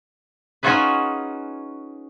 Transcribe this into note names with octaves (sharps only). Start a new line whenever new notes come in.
C#4 D#4 F4 F#4 G#4 B4